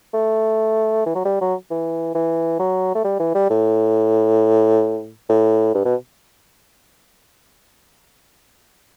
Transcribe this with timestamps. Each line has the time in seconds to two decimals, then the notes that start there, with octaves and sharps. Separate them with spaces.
0.14 A3
1.06 E3
1.15 F#3
1.25 G3
1.41 F#3
1.70 E3
2.15 E3
2.59 F#3
2.95 A3
3.04 G3
3.19 E3
3.35 G3
3.50 A2
5.29 A2
5.74 G2
5.85 B2